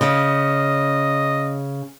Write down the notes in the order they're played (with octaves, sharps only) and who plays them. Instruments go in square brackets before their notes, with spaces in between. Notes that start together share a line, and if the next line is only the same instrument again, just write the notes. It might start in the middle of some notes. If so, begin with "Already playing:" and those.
[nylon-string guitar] C#3 [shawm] D#5